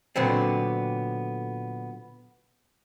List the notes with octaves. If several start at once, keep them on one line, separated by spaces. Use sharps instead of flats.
A#2 D3 F#3 B3 C4